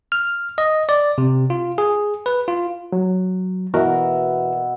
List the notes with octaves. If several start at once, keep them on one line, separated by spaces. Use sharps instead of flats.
F6
D#5
D5
C3
F4
G#4
B4
F4
F#3
B2 E3 F#4 A#4 E5